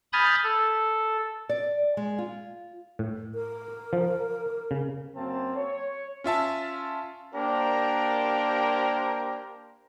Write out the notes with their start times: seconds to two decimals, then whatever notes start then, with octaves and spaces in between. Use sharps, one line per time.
0.13 G#5 B5 D#6 F6 G6 A6
0.44 A4
1.49 D5
1.97 G#3
2.18 F4
2.99 A2
3.35 A#4
3.93 F3
4.71 C#3
5.15 F#2 A#3 C4 A5
5.56 C#5
6.24 C#4 F4 E5 A5
7.35 A#3 D4 G4 A#4 C5 A#5